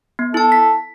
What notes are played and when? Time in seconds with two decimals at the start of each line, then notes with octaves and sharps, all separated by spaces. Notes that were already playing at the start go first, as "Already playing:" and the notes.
0.19 B3
0.34 E4 A4 A5
0.52 B6